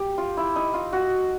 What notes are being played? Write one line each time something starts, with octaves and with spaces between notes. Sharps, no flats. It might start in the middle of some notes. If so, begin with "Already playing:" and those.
Already playing: G4
F4
E4
D#4
F4
F#4